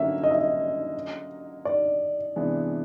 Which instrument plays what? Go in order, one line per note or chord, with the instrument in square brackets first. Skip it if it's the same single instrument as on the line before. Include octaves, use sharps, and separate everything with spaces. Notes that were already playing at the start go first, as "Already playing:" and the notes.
Already playing: [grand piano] D3 F#3 A#3 C#4 [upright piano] E5
[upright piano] D#5
E5
D#5
D5
[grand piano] C3 E3 G#3 B3 D4